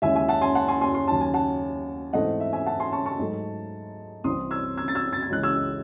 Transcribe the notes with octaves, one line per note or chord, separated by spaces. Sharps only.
D#2 C#3 G#3 C#4 E4 E5 G#5
E5 G#5
F#5 A5
G#5 C6
F#5 A5
G#5 C6
G#5 C6
C6
D#2 C#3 F#3 C#4 A5
G#5
F#5 A5
G#2 E3 A3 C4 D#5 F#5
E5
E5 G#5
F#5 A5
G#5 C6
A5 C#6
A5 C#6
G#2 F#3 A3 D#4
C2 C3 E3 C4 C6 D#6
E6 G#6
E6 G#6
A6
E6 G#6
A6
G#6
C#2 C#3 E3 G#3 C#4 F#6
E6 G#6